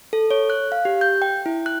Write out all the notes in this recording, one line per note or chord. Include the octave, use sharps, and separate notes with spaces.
A4
C#5
F#6
F5
G4
G6
G5
E4
F#6